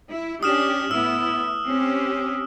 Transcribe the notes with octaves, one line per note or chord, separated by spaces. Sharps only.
E4
C#4 D4 G4 D#6 F6 E7
A2 B3 E4 E6
C4 C#4 G4